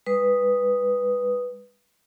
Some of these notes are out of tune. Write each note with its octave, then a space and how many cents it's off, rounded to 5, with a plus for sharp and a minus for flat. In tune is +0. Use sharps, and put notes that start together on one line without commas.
G#3 -45 B4 +0 D#6 +0